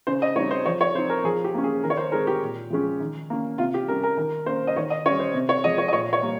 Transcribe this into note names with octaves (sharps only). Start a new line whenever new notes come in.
C#3 C5
D#5
G3 C4 D#4 C#5
C5
F3 C#5
C#5
C4 D#4 C5
A#4
F3 G#4
G4
A#3 C#4
G#4
D#3 A#4
C#5
C5
G#3 C4 D#4 A#4
G4
A#2
F3 G#3 C#4
D#3
A#3 C#4
C3 F4
G4
G3 C#4 A#4
A#4
D#3 A#4
A#3 C#4 C5
D#5
D#3 C#5
D#5
G3 C#4 C#5
C5
C3
C#5
F3 G#3 D#5
C#5
D#5
A#2 C#5
C#5
G3 A#3